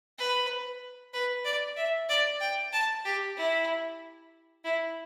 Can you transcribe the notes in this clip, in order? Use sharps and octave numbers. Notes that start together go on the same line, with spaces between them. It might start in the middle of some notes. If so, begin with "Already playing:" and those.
B4
B4
D5
E5
D5
G5
A5
G4
E4
E4